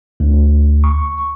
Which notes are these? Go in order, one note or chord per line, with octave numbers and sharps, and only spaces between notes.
D2
C#6